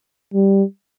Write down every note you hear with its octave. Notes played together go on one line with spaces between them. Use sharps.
G3